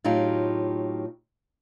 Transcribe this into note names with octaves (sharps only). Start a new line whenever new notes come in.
A2 F#3 D#4 F4 G4